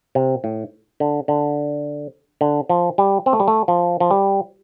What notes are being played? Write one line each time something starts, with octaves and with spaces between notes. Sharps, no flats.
C3
A2
D3
D3
D3
F3
G3
C4
A3
G3
A3
F3
F3
G3